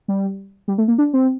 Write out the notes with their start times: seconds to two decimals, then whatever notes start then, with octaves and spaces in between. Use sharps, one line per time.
0.08 G3
0.68 G3
0.78 A3
0.88 A#3
0.98 D4
1.14 C4